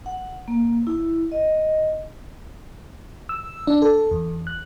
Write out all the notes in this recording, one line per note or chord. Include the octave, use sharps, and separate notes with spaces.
F#5
A#3
E4
D#5
E6
D4
A4
E2
F#6